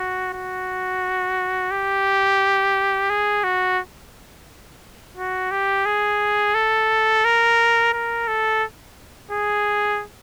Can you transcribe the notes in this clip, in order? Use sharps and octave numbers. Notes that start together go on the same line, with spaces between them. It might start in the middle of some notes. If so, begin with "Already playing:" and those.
Already playing: F#4
F#4
G4
G#4
F#4
F#4
G4
G#4
A4
A#4
A#4
A4
G#4